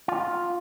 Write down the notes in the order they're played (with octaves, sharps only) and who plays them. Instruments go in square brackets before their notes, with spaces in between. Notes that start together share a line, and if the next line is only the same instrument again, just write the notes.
[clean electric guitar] F4